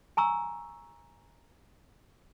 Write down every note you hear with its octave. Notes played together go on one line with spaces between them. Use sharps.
G#5 A#5 C#6 E6